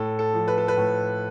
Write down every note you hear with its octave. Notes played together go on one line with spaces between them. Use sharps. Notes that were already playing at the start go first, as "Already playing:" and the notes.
Already playing: A2 A4
A4
F3
B4
A4
B4
A2